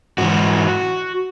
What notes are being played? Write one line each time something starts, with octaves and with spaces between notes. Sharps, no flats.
G#2 E3 F#4